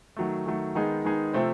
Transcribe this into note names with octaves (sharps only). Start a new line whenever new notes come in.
D#3 F#3 A3
D#3 F#3 A3
D#3 G#3 B3 D#4 G#4
D#3 G#3 B3 D#4 G#4
C3 F3 A3 C4